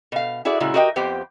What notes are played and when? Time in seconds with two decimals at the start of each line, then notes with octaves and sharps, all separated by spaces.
0.12 B2 F5
0.45 E4 F#4 G#4 D5 E5
0.60 A#2 C#3 G#3 E4 F#4
0.74 F#4 G4 A#4 D#5 E5 G5
0.96 F2 B3 G4 C5 G5